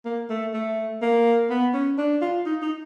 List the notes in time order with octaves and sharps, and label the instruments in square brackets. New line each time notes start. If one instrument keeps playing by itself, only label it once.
[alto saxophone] A#3
A3
A3
A#3
B3
C#4
D4
F4
D#4
D#4